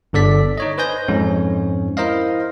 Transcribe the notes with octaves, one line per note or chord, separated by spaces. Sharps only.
G1 D3 A4 D5 B6
D#4 C#5 D#5
B4 C5 D#5 G#5 G6 A#6
F2 G#2 C#4
E4 A#4 C5 D#5 F5